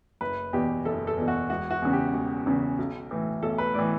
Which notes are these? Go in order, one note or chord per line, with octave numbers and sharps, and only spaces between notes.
F#1 B4
E2 B2 G4
F#1 A4
A4
E2 B2
F#4
E1 F#4
F#4
E2 C#3
G4
E1
E2 C#3
B1
A2 E3
B1 A4
B4
A2 E3 D5